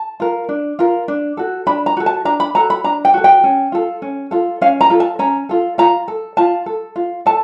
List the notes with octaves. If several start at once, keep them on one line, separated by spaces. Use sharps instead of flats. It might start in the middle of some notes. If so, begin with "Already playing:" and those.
Already playing: A5
F4 A#4
D4
F4 A#4
D4
F#4 A4
D4 B5
A#5
F#4 A4
A5
D4 A#5
B5
F#4 A4 A#5
B5
D4 A#5
G5
F#4 A4
G5
C#4
F4 A4
C#4
F4 A4
C#4 F5
A#5
F4 A4
A5
C#4 A#5
F4 A4
F4 A#5
A4
F4 A5
A4
F4
A4 A5